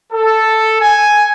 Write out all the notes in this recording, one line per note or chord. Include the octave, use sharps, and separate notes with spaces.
A4
G#5